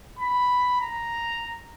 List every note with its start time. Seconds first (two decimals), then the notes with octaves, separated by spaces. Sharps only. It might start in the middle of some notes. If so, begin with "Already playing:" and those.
0.19 B5
0.81 A#5